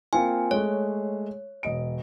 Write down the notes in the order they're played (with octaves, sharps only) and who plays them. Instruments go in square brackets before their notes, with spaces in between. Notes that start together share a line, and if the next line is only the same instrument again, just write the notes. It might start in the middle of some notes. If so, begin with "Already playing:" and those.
[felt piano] A#3 C4 F4 [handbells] G#5
[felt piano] G#3 A3 [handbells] C#5
[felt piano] E1 D#5 D7